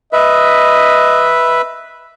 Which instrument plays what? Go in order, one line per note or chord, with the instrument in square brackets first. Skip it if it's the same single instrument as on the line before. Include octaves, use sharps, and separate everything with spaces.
[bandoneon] B4 E5 [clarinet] D#5